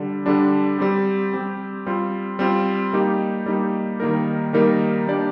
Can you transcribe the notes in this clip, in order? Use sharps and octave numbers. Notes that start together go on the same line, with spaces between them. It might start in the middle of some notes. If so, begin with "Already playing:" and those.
Already playing: D3 G3 D4
D3 G3 D4
G3 C4 G4
G3 C4 G4
G3 C4 F4
G3 C4 F4
G3 A#3 D#4 G4
G3 A#3 D#4 G4
D#3 G3 A#3 D#4 A#4
D#3 G3 A#3 D#4 A#4
G3 A#3 D4 G4 D5